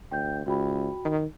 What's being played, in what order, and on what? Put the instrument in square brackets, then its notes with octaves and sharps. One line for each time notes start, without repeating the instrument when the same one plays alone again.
[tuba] D2 [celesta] G5 G6
[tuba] C#2 [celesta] F#4 G5 B5
[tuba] D#3